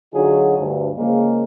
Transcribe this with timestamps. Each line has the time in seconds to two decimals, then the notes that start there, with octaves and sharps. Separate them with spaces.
0.14 D3 F#3 D#4 F4 F#4 G#4
0.59 D2 G2
0.97 C#3 F3 G#3 A#3